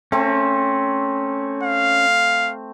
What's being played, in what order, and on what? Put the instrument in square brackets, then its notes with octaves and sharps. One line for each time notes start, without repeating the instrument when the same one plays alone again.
[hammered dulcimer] A3 C4 [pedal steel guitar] C#4
[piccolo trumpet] F5